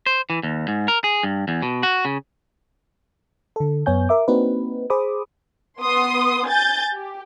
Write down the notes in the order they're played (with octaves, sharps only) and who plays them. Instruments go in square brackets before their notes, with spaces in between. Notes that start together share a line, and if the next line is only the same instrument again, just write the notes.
[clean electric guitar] C5
E3
D#2
G#2
A#4
G#4
G2
E2
B2
F#4
C#3
[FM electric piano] D3 A4
F#2 B3 C#5 G#5 G6
A#4 E5 D6
A#3 C4 D4 D#4 F#4 B4
G#4 C5 B5 D6 D#6
[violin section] B3 C6 D#6
G#5 G6 A6
G4